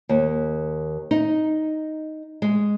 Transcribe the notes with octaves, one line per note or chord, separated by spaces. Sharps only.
D#2
D#4
G#3